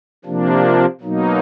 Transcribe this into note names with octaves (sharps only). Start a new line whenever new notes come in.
C3 F3 A#3 D4
B2 F#3 A#3 D#4